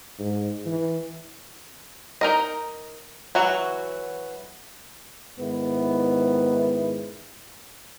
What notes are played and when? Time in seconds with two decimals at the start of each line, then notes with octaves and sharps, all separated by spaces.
0.19 G#2
0.66 E3
2.21 D#4 A#4 D#5
3.35 E3 F#3 F#4
5.39 G#2 D#3 B3 E4